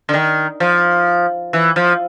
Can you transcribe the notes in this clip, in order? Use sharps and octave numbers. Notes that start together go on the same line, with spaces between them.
D3
D#3
F3
E3
F3